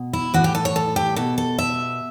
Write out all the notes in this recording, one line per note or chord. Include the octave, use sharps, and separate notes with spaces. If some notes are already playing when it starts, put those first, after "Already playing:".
Already playing: B2
E4
A2 E3 F#4
G4
A4
C#5
A4
G4
B2 A4
A4
E5